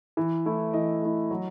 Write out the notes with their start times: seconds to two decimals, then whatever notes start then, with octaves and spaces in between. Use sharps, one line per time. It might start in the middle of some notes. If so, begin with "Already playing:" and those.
0.17 E3
0.46 A3 E4
0.74 E3 D#5
1.02 A3 E4
1.31 F#3